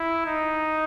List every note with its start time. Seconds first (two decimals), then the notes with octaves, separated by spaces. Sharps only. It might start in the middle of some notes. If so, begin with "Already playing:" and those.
Already playing: E4
0.26 D#4